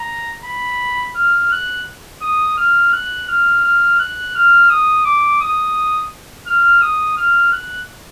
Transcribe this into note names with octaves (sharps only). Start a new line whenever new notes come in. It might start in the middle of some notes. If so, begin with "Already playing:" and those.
Already playing: A#5
B5
F6
F#6
D#6
F6
F#6
F6
F6
F#6
F6
D#6
D6
D#6
F6
D#6
F6
F#6